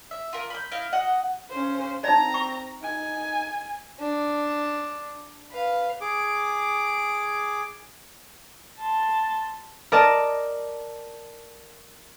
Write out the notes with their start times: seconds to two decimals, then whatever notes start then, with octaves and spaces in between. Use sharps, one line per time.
0.11 E5
0.33 F4 A#4 D6
0.50 B5 G6
0.71 E4 D#5 F5
0.93 F#4 D#5 F#5
1.50 C#3 C#4 C5
2.04 C4 D#4 D5 A#5
2.34 C#6
2.83 D#4 G#5
4.00 D4
5.51 B4 F5
6.01 G#4 D6
8.80 A5 C6
9.92 A#4 D5 D#5 A5